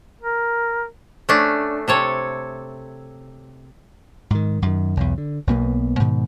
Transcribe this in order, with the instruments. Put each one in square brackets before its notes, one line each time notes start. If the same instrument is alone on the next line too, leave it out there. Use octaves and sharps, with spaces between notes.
[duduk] A#4
[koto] A3 C#4 D4
C3 A4 C#5
[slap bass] G#2 D#3
F#2 D#3
B1 E2
D3
B1 B2 A#3 B3
G#2 B2 D#3